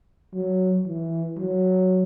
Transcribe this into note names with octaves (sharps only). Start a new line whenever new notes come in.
F#3
E3
F#3